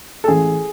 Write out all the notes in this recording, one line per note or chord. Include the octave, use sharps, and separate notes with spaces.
A4
A1 G#4